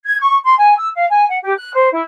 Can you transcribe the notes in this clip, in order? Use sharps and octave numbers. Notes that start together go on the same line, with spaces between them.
G#6
C#6
C6
G#5
E6
F5
G#5
F#5
G4
F#6
C5
E4